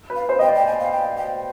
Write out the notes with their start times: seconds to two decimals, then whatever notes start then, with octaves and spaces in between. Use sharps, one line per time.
0.10 B4
0.16 F5
0.29 C5
0.39 D#5 G5
0.48 D5
0.55 G5
0.66 G#5
0.80 F5
0.92 G5
1.17 G5